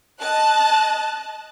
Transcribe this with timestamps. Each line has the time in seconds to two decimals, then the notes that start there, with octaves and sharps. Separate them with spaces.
0.21 D#5 A5 F#6